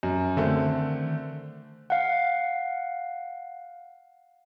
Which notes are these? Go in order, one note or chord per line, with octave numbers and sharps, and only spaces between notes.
F#2
D3 D#3 A3 C4
F5 F#5